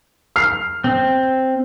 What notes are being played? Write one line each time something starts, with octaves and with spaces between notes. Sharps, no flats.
F6 C7
C4